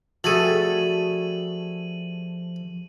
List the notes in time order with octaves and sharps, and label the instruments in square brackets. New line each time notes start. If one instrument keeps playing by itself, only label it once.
[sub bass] F3 [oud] G3 F#4 [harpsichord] A3 G#4 A4 [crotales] D#7 F#7